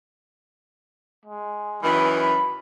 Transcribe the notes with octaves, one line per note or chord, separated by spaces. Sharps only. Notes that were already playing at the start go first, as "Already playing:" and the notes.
G#3
F#2 D#3 E3 B5
B5